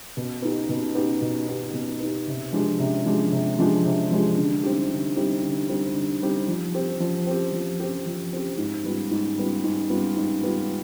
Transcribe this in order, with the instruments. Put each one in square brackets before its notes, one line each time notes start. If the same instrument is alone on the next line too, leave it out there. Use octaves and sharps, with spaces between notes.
[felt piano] B2
B3 D#4 G4
B2
B3 D#4 G4
B2
B3 D#4 G4
B2
B3 D#4 G4
C3
F3 G#3 D4 G4
C3
F3 G#3 D4 G4
C3
F3 G#3 D4 G4
C3
F3 G#3 D4 G4
D3
G3 C4 D#4 G4
D3
G3 C4 D#4 G4
D3
G3 C4 D#4 G4
D3
G3 C4 D#4 G4
F3
C4 G4
F3
C4 G4
F3
C4 G4
F3
C4 G4
G#2
G3 B3 F4
G#2
G3 B3 F4
G#2
G3 B3 F4
G#2
G3 B3 F4